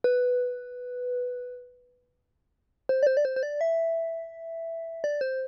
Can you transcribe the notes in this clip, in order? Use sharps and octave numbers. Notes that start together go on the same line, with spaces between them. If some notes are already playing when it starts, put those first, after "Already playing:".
B4
C5
D5
C5
D5
C5
C5
D5
E5
D5
C5